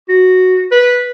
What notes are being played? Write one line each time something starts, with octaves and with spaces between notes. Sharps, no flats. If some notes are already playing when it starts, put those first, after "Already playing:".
F#4
B4